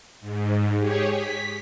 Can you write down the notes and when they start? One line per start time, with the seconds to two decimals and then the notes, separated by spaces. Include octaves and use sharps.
0.21 G#2
0.79 G4 G#4 C#5
1.12 B6